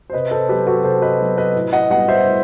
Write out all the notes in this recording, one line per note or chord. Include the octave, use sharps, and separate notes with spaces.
C5
C3 B4 D#5
A4 C5
F#3 B3 G4 B4
F#4 A4
C3 A4 C5
B4 D#5
F#3 B3
B4 D#5
A2
D#5 F#5
G3 B3 D#5 F#5
C5 E5
A2